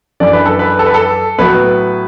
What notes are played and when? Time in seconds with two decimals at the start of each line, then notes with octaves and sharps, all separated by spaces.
0.20 F#2 E3 D4 D5
0.33 B4
0.46 A4
0.59 B4
0.79 A4
0.86 B4
0.94 A4
1.38 A2 F#3 B3 B4